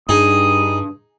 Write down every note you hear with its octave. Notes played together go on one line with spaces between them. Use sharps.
G2 D4 D#4 G#4 D#6